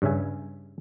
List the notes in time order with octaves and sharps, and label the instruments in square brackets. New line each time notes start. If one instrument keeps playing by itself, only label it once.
[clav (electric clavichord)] G2 C#3 E5 G#5